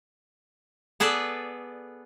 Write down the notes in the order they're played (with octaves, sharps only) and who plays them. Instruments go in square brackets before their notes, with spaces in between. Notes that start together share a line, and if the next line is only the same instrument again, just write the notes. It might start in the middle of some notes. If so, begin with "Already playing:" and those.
[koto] B3 G#4 A4 B4 D5